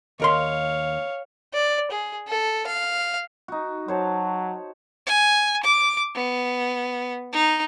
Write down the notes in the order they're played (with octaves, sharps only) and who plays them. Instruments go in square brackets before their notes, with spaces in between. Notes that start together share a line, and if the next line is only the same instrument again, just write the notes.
[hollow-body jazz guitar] D#2 A#4 C6 [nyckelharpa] C#5 F5
[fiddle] D5
G#4
A4
F5
[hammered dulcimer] D#4 F#4
[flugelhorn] F#3 [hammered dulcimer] C5 C#5 A5
[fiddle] G#5
D6
B3
D#4